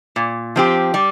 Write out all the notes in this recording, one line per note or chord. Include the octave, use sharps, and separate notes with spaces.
A#2
F3 C4 G4
G3